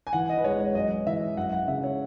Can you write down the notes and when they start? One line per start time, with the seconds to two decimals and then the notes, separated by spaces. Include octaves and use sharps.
0.07 G#5
0.13 E3 F#5
0.29 D#5
0.38 B4
0.44 G#3 C#5
0.59 C#5
0.75 F#2 D#5
1.07 E3 E5
1.37 F#2 F#5
1.52 F#5
1.67 C#3 E5
1.84 C#5